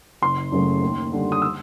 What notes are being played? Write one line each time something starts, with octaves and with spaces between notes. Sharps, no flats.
F#1 C6
F#2 C#3 F#3 A3
D#2
D3 G3
D#6
E6